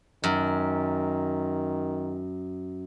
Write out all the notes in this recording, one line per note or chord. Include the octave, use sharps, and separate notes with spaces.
F#2 D#3